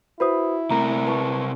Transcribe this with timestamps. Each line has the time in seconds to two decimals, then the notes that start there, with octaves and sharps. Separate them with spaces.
0.20 E4 F#4 B4 C5 B5 D#6
0.70 C3 A3 C4 A#4 A#5
1.07 B4 A5 C#6